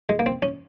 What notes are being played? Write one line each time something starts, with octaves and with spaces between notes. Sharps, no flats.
G#3
A#3
C4
C#4